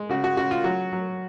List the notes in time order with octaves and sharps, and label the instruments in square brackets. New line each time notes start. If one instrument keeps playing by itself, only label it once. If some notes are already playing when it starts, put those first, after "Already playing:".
Already playing: [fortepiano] G#3
C#3 F#4
F#4
C#3 F#4
F4
F#3 F#4
F#3